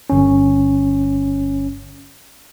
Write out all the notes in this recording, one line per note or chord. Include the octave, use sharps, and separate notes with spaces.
G1 C#4